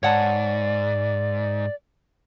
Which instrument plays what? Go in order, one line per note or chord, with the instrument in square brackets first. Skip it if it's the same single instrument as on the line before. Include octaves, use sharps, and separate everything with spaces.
[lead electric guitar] G#2 [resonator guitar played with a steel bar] C#5 F#5 A5 [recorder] D5